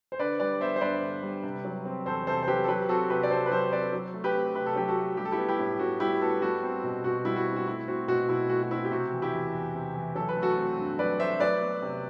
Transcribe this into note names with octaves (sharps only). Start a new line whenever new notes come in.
C5
D3 B4 D5
G3 B4 D5
B3 C5 E5
C5
G2 B4 D5
D3
G3
C3
F#3
C4
E2 A4 C5
C3 A4 C5
C5
F#3 G4 B4
A4
F#3 G4 B4
C4 F#4 A4
C3 G4 B4
D5
C3 A4 C5
B4
F#3 A4 C5
C4 B4 D5
F#3
A3
G4 B4
C4
C3 B4
A4
F#3 G4
F#4 A4
A3
G3 G4
A4
E4 G4
B3
E4 G4
A2
A2 F#4
G3 E4 G4
B3 F#4 A4
G3 F#4 A4
C4
B2
B2 F#4
G3 E4
F#4
C4
F#4
A3 E4
C4 F#4
B2 F#4
B2 E4
A3 F#4
F#4
C4 E4
G4
C3 F#4
E3
E4 G4
E2
E2
C3
E3
F#3 A4
B4
A3
F#4 A4
C4
G2
F#3 B4 D5
A3 C5 E5
F#3 B4 D5
B3
C3